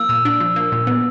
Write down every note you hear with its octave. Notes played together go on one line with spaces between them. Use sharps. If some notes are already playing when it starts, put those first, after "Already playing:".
Already playing: F3 A#3 E6
A#2
D4
F3
A#3
A#2
B3